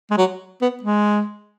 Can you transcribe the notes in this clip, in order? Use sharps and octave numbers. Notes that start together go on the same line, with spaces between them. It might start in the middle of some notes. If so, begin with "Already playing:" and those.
G#3
F#3
B3
G#3